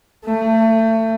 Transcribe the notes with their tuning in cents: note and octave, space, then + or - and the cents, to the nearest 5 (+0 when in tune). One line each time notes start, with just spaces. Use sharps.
A3 +30